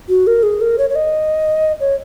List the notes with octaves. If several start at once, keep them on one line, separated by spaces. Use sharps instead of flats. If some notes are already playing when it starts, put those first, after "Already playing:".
F#4
A#4
G#4
A#4
C#5
C#5
D#5
C#5